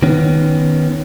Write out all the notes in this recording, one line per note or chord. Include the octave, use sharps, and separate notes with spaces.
D#3 B3 C#4